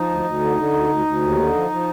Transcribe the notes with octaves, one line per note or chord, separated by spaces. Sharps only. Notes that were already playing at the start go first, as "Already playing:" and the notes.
Already playing: F3 D#4
D2
D2
D3
D3
D2
D2
D2
D#2
D3
F3
F3